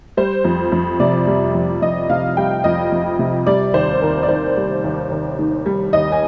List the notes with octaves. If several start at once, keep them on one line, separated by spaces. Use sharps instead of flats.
G3 C5
F2
F2
C3 D5
G3
F2
F2 D#5
C3 F5
G3 G5
F2 D#5
F2
C3
G3 D5
D#2 C5
D#2 A#4
D5
D#3 C5
G3
D#2
D#2
D#3
G3
D#2 D#5
G#5